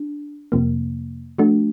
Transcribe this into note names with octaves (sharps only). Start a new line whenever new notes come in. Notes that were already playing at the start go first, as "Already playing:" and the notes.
Already playing: D4
F2 C3 F3 A#3
F3 A3 D4 F#4